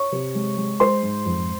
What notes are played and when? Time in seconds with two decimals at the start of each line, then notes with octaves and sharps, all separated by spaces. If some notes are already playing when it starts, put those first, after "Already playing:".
Already playing: C#5 C#6
0.12 C3
0.35 G#3
0.57 G#3
0.80 G#3 C5 C6
1.02 G#2
1.26 F2